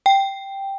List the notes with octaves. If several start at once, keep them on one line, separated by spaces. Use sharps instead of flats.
G5